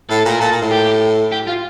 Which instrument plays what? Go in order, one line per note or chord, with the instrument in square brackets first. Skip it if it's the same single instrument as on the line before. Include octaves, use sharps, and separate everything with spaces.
[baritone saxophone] A2 [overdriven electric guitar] A4
[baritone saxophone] A#2 [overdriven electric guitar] A#4
[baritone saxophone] A#2 [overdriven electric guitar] A4
[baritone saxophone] A#2
A2
[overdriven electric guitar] G4
G4
F4